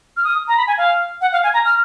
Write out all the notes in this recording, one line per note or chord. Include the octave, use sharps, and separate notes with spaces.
F6
D#6
A#5
B5
G#5
F5
F#5
F5
G#5
A#5
F6